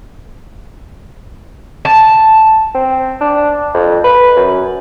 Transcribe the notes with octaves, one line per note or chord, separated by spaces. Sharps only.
A5
C4
D4
F2
B4
F#2